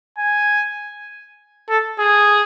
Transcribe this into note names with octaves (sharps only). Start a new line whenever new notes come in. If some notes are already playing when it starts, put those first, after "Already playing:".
G#5
A4
G#4